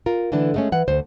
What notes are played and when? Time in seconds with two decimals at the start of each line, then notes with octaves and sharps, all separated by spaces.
0.06 F4 A#4
0.32 D3 E3 A3 D4
0.54 G#3 A3 C#4
0.72 E3 F#5
0.88 D2 C5